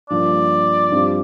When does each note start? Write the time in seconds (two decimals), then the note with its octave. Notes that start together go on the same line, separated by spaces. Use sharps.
0.10 G2 F3 A#3 D5
0.91 G2 F3 C4 G4 C5